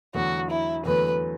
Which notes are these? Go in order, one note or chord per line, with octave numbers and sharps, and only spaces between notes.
E2 D3 F#3 A3 F#4
E4
E2 D3 F#3 A3 B4